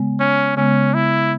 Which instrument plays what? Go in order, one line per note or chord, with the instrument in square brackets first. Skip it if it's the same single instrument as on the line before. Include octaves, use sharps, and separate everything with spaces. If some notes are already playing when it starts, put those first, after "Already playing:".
Already playing: [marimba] C#3 G#3 B3
[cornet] C#4
[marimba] C#3 G#3 B3 [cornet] C#4
[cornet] E4